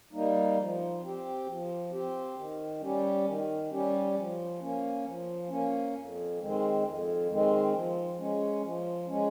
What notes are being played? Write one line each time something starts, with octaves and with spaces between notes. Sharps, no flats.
G3 A#3 D#4
F3
C4 G4
F3
C4 G4
D#3
G3 C#4 G4
D#3
G3 C#4 G4
F3
A#3 C#4
F3
A#3 C#4
F2
D#3 G#3 C4
F2
D#3 G#3 C4
F3
G#3 C#4
F3
G#3 C#4